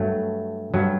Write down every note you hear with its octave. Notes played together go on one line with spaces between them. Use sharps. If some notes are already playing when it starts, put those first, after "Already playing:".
Already playing: G2 F#3 A3
G2 F#3